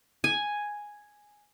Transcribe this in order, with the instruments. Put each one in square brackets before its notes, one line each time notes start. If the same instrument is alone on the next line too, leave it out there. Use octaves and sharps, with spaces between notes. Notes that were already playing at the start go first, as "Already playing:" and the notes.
[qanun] G#5